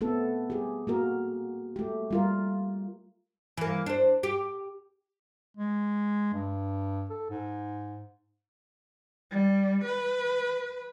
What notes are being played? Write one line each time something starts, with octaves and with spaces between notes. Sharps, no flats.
A3 B3 C4 A4
G4 G#4
A#3 F#4 A#4
A3 G4
G3 F4 A#4
E3 A#3
D4 C5
G4
G#3
G2
A4
G#2
G3
B4